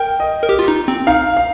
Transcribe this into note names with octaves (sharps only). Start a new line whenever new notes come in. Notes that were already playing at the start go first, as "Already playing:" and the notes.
Already playing: A#4 G5
D#5
A#4
G4
F4
D#4
C4
D#4 F5
F5